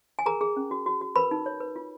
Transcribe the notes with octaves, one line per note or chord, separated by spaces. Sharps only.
G#5
G#4 A#4 A#5
G#4
C#4
F#4
F#4
F#4
A#4 B4 B5
D#4
C#5
B4
F4